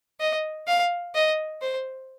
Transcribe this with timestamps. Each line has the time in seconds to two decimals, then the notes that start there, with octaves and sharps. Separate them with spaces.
0.20 D#5
0.67 F5
1.15 D#5
1.61 C5